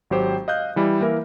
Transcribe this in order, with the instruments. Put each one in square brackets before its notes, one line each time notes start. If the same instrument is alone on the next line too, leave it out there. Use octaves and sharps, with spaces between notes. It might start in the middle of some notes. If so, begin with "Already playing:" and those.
[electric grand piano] G#1 F#3 G4 C5 G5
D#5 F5 F#6 G6
E3 G3 E4
E3 A#3 A#4 E5